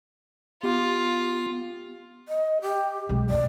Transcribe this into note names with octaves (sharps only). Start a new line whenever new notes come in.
B3 F4 G4
D#5
G4
B1 G#3
F#2 A#2 D5